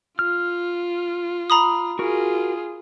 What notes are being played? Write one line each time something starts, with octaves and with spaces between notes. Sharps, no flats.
F4 F6
A#5 B5 D#6
F4 F#4 G#4 A#4